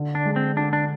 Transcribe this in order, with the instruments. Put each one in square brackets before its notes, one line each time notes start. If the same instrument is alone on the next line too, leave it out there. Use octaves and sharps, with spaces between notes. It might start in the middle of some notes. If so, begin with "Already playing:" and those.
Already playing: [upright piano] D3
[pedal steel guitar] D4
[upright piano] G#3
[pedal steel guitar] C4
[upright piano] D3 [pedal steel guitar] D4
[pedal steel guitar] D4